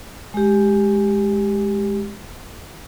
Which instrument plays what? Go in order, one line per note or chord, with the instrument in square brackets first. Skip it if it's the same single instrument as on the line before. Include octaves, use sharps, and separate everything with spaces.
[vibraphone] G#3 G4